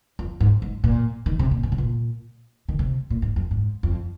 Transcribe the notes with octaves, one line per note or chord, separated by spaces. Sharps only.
F2
G#2
G#2
A#2
D#3
C3
A#2
G#2
C3
A#2
D#3
C3
A#2
G#2
F2
G#2
F2